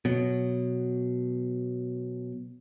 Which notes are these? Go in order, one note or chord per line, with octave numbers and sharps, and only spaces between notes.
B2 F#3